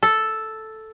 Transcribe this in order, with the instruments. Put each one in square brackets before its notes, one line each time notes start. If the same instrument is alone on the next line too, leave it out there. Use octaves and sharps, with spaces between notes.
[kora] A4